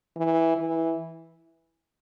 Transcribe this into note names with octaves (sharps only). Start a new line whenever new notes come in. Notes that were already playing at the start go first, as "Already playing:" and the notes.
E3
E3